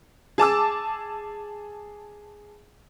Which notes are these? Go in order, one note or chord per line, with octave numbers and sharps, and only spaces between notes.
G#4 A5 D6 E6